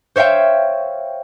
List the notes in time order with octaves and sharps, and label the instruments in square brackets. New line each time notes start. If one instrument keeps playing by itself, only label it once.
[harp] C5 C#5 E5 F5 G5